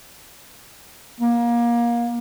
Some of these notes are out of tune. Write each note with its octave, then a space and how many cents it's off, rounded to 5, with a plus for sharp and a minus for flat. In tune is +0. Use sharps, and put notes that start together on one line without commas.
A#3 +25